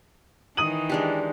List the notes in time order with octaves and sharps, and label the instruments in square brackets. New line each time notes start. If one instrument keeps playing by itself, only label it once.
[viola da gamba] D#3 E3 [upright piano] D#6 D#7 F#7
[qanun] G#3 D4 G4